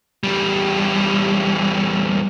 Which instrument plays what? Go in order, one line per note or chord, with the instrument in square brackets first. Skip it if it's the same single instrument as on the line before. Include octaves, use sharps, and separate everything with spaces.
[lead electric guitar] E2 G3